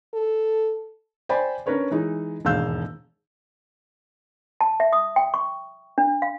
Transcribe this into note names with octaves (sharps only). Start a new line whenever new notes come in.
A4
C5 D5 G5 G#5 B5
C#4 D4 A#4 B4 C#5 D5
E3 G#3 D#4
E1 D#2 G#2 F5 E6 G6
A5
E5
D#6
G5
C#6
D4
F5